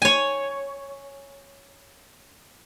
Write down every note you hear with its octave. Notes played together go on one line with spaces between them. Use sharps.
C#5 G#5